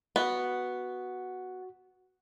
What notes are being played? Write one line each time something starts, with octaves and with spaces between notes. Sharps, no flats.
B3 F#4